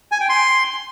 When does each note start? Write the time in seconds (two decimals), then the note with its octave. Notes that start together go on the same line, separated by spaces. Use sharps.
0.12 G#5
0.20 G5
0.29 C6